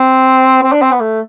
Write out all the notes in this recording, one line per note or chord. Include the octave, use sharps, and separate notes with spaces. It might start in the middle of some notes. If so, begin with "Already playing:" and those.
Already playing: C4
C4
D4
C4
B3
A3